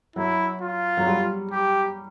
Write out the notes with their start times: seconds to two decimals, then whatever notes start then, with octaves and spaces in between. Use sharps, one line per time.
0.16 F#3 E4
0.61 F4
0.97 F#3
1.07 G3
1.51 G4